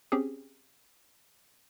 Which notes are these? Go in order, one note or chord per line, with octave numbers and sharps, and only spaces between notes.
C4 C#4 G4 G#4